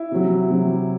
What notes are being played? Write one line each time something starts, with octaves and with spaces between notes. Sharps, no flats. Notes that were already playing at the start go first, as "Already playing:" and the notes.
Already playing: E4
C3 F#3
C3 F#3